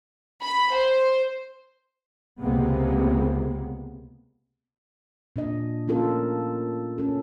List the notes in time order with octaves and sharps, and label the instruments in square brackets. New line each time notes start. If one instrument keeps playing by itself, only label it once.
[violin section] B5
C5
[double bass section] C#2 C3 G#3 A#3 B3
[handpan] A#2 D4 D#5
A#3 C#4 F4 A4 A#4
C#4 A4